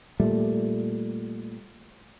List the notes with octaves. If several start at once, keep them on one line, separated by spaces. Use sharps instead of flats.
A#2 G3 A3